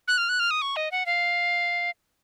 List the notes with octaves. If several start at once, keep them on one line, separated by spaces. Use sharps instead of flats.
F#6
F6
F#6
F6
D#6
C#6
D#5
F#5
F5